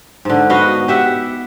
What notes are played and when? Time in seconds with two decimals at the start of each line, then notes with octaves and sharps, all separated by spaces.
0.25 G#2 D3
0.50 B3 F#4 D#5 F5
0.88 G4 E5 F#5